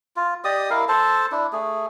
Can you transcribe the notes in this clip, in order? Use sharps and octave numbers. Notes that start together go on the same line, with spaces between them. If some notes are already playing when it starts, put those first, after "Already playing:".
F4
G4 D5 D#5 D#6
E4 A#4 F5
A4 C5 A5
D4 E4
A3 G#4